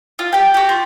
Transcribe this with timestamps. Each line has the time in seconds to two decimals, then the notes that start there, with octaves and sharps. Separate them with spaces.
0.19 F4
0.33 G4 G5
0.54 F#4 G4
0.69 F4